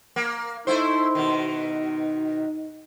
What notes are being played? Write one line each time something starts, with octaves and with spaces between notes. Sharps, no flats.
A#3
A3 D#4 E4 C5
B2 D#3